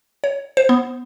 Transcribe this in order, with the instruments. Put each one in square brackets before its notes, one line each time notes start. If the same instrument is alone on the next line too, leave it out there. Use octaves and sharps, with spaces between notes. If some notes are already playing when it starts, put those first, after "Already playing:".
[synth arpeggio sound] C#5
C5
B3